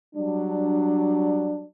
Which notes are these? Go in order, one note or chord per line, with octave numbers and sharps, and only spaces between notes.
F#3 G3 D4